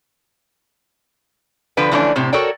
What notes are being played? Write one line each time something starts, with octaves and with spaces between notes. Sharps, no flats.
D3 F3 B4 G5
D3 E3 F3 A3 C#4 D4
A2 C3 C4
F#4 A4 A#4 C#5 D5 G5